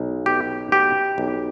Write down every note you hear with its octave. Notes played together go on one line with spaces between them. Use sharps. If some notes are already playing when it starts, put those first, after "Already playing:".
Already playing: B1
B2 G4
B2 G4
B1